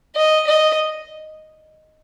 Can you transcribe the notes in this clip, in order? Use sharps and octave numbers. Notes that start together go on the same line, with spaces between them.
D#5
D#5